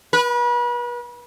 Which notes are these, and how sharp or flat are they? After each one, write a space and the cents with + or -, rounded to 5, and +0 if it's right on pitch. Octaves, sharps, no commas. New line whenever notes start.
B4 -35